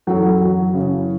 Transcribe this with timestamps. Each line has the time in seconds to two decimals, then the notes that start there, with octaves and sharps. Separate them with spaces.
0.07 F#2 E3 F#3 C#4 A4
0.41 F#3
0.74 C#3